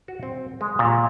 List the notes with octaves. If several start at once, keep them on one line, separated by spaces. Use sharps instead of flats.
F#4
C4
G#3
A#2